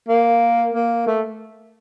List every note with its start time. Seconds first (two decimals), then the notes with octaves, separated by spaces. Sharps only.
0.08 A#3
0.74 A#3
1.07 A3